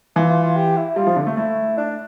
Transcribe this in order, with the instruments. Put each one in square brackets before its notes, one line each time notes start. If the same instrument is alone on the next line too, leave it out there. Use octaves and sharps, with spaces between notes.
[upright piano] E3 [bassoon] F4
[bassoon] F4
F4
G4
E4
[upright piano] G3 [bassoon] F4
[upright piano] F3
D3
A3
[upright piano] A3 [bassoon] E4
[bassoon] D4